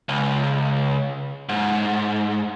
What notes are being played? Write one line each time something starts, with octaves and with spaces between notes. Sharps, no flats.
C#2
G#2